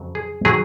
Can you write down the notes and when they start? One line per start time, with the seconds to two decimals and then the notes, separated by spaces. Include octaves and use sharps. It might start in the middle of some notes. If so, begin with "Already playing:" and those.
Already playing: F2 C#3 F#3
0.15 G#4
0.45 D#3 F#3 G#4